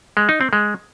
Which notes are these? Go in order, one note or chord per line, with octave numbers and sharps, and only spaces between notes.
G#3
D#4
C4
G#3